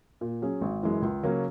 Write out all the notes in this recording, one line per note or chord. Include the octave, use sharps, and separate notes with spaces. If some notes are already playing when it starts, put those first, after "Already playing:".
A#2
F#3 C#4 G#4
G#1
F#2 E3 G#3
C#2
C#3 F#3 A#3 C#4